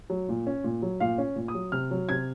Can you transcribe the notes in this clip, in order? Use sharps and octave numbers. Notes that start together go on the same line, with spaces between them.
F#3
A#2
C#4
A#2
F#3
A#2 F5
C#4
A#2
D#6
F#3
C3 F6
F#3
C3 G#6